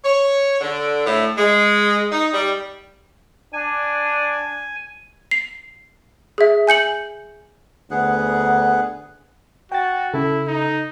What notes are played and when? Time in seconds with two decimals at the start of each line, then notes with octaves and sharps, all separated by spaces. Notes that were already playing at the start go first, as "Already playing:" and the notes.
0.04 C#5
0.61 D3
1.07 A2
1.38 G#3
2.12 D#4
2.33 G3
3.53 D4 G#5
5.31 C7
6.38 G#4 E5
6.67 G#5 G6 C#7 F#7
7.91 D2 B3 G#4 F#5
9.72 F#4 G5 A6
10.14 C#3 E4 A4
10.47 D#4